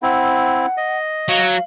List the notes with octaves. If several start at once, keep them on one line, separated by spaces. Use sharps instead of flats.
C4 E4 F#5
D#5
F#3 F5